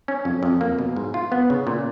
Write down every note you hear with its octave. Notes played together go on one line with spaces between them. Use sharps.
C#4
F2
F2
A#3
B2
G#2
F4
B3
C#3
A#2